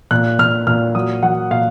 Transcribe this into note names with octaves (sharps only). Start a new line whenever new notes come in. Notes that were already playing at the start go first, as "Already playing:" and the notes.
A#2 F#6
A#2 F6
A#2 F6
F#3 D#6
F#3 F#5
A#2 F5